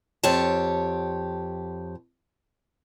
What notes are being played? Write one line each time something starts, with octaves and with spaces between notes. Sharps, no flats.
F2 G4 C#5 A5